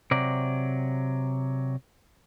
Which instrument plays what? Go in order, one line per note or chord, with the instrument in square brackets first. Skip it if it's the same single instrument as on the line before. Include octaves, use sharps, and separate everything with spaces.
[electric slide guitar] C3 F#3 D5